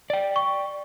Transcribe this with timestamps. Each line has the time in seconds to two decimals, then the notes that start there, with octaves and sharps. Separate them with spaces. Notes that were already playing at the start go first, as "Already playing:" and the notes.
0.10 D5 G5
0.36 C#6